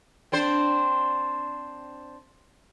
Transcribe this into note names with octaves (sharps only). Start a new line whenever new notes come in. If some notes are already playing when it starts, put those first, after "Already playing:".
C4 D4 C5